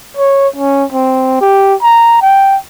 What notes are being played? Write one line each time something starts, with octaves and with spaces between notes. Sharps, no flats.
C#5
C#4
C4
G4
A#5
G5